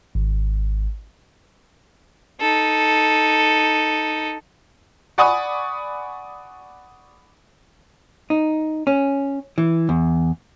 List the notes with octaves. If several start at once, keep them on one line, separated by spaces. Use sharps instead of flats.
G#1
D#4 A4
D5 F#5 G#5 B5 C#6 D#6
D#4
C#4
E3
E2